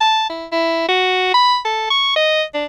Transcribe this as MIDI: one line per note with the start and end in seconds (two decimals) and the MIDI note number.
0.01 0.25 81
0.30 0.46 64
0.52 0.84 64
0.89 1.32 66
1.34 1.58 83
1.65 1.88 69
1.90 2.12 85
2.16 2.43 75
2.54 2.65 62